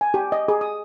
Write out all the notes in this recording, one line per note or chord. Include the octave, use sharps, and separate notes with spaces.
G#5
G4
D#5
G#4
D#6